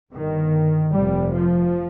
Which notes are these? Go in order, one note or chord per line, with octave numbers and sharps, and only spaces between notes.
G1 G2 D#3
F1 F2 C3 G3
F3